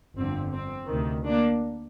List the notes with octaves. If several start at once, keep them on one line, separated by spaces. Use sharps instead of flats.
G1 F2 D3 C4
C4
D2 C3 D#3
A#3 D4